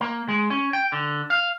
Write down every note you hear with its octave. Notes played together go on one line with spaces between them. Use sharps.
A#3
G#3
C#4
G5
D3
F5